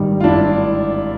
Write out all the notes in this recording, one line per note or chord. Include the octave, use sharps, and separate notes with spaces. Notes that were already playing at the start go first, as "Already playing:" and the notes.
Already playing: G#1 G2 D#3 G3 D#4
F4
G#1 D4 E4